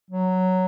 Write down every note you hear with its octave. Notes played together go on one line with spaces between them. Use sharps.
F#3